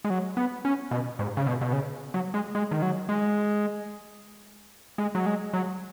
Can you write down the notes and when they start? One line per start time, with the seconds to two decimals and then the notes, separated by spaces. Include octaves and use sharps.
0.04 G#3
0.10 F#3
0.37 B3
0.65 C#4
0.91 B2
1.19 G#2
1.37 C#3
1.46 B2
1.61 B2
1.73 C#3
2.14 F#3
2.34 G#3
2.55 G#3
2.71 D#3
2.82 F#3
3.09 G#3
4.98 G#3
5.15 F#3
5.26 G#3
5.53 F#3